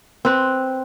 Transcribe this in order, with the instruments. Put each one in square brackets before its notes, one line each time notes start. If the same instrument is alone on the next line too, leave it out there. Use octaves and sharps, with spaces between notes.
[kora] C4 B4